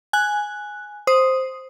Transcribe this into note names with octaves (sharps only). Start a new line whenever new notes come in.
G#5 F#6
C5 D#6